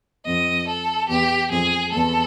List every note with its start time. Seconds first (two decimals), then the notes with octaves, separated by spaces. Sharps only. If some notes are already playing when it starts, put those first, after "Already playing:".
0.25 F2 D#5
0.67 A4
1.09 E2 G4
1.50 F2 G#4
1.92 E2 A4